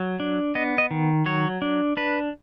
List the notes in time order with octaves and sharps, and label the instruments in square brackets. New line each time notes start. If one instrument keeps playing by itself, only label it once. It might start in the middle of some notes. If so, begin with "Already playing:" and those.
Already playing: [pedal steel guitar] F#3
D4
B3 D#5
D#5
D#3
F#3 C#5
D4
D4 B4